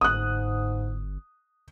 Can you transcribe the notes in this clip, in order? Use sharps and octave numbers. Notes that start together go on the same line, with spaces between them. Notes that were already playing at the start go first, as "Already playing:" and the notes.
G1 G#2 D#6 F#6